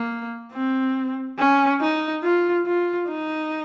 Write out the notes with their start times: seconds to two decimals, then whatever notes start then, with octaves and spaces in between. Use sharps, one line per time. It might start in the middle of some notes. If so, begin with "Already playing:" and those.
Already playing: A#3
0.52 C4
1.38 C#4
1.81 D#4
2.23 F4
2.66 F4
3.09 D#4